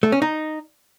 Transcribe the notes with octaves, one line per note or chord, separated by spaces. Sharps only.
A3
C#4
D#4